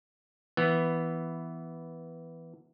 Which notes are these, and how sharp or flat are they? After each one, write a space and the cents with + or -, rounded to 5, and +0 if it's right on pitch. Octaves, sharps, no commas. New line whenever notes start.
E3 +0 B3 +0